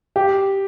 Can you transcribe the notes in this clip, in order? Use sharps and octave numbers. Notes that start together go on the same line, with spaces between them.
G4